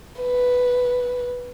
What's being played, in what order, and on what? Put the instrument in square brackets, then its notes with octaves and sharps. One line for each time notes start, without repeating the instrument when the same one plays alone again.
[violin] B4